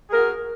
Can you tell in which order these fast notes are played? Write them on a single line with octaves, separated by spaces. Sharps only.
G#4 A#4 F#4